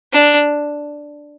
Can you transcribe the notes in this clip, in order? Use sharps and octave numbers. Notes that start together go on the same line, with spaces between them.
D4